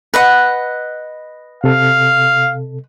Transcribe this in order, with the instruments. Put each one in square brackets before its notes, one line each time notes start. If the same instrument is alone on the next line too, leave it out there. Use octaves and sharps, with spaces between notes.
[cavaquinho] B4 D#5 F#5
[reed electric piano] C3 A4 [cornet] F5